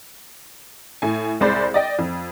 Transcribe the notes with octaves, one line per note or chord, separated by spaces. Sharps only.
A2 G#5
C2 G#3 C5 D5 B5
D5 D#5 G5
F2